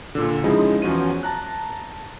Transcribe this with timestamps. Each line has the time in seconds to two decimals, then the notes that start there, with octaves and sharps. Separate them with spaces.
0.15 A#2 D3
0.44 C#3 F3 G#3 D#4 E4
0.82 E2 F3 C#4 F4 F#4 D#7
1.23 A5 A#5 F#6